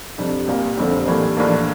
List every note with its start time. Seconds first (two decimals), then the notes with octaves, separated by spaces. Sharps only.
0.18 F2 C3 G3 D4
0.47 C2 A#2 G3 A#3
0.77 F1 F2 D3 G3 C4
1.07 A2 E3 G3 A#3 D4
1.37 A#1 A2 E3 A#3 D4